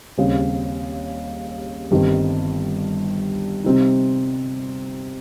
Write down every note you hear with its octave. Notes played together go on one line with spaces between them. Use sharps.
D#2 C#3 G3 C4
G1 G2 D#3 G3 C4
C3 G3 C4 D#4